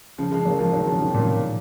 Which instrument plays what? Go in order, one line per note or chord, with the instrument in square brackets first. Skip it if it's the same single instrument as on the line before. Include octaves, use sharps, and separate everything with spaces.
[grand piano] C#3 F3
F3 G#3
F#3 A#3
F3 G#3
D#3 F#3
C#3 F3
C3 D#3
A#2